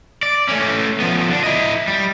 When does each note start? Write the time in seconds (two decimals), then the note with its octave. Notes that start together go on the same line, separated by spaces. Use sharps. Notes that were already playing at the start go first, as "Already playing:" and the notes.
0.23 D5
0.49 A3 C#4
1.00 F3 B3
1.29 D3 D4
1.44 E4 D#5
1.88 G3